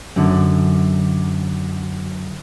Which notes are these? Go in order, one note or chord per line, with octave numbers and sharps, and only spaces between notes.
F#2 D3